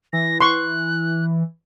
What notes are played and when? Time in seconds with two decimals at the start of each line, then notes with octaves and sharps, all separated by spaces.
0.13 E3 A#6
0.41 C6 C#6 F#6